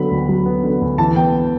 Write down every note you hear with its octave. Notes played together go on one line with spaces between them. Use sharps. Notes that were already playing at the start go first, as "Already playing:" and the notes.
Already playing: D3 F#3 B3 B5
D2
F#3
B3
D3
D2
E3 A5
B3 G5